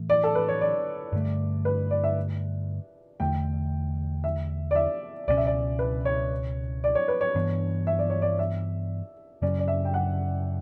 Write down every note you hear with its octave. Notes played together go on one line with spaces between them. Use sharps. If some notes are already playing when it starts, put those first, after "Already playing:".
Already playing: A2 E3 A3
D5
A4
B4
C#5
D5
G2 D3 A3
B4
D5
E5
E2 D3 A3 G5
E5
D5
E5
C#2 B2 F#3 C#4 D5
E5
D5
B4
C#5
D5
C#5
B4
C#5
G2 E3 B3 D4
E5
D5
C#5
D5
E5
F#2 C#3 F#3 C#4 D5
D5
E5
G5
F#5